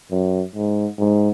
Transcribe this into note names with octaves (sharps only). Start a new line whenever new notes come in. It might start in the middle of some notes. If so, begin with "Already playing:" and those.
F#2
G#2
G#2